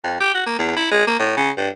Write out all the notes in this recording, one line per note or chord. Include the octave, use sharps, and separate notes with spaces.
F2
G4
F#4
A#3
E2
E4
G#3
A#3
A2
C#3
G2